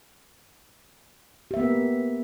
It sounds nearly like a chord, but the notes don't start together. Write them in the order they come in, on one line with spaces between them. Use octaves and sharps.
G4 E5 A#3 B3 A#4